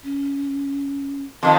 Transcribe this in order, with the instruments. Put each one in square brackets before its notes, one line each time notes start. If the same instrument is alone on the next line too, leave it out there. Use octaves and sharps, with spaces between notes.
[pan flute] C#4
[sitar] F2 D#3 F3 [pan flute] C6